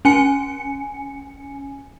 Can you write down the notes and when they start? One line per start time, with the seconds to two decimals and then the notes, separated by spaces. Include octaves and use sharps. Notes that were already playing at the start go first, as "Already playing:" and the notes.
0.05 C#4 G#5 C#7